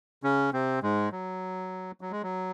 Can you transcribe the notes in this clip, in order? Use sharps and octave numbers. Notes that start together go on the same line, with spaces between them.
C#3 C#4
C3 C4
G#2 G#3
F#3
F#3
G#3
F#3